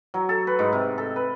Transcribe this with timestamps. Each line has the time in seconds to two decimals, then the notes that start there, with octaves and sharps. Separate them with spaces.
0.14 F#3
0.29 A4
0.47 B4
0.59 G#2
0.73 C3
0.98 A4
1.16 B4